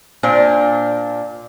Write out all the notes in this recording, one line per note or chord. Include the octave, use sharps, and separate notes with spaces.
A#2 D4 C5